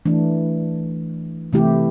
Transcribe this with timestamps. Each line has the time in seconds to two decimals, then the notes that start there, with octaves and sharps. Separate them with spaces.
0.05 E3 A3 D4
1.53 C3 E3 A3 E4 G4